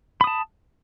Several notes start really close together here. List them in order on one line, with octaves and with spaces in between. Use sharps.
B5 D#6 A5